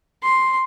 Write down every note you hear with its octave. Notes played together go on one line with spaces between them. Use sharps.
C6